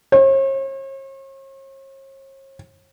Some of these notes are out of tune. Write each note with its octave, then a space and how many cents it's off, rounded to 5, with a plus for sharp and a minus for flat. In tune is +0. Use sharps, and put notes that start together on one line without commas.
C#5 -45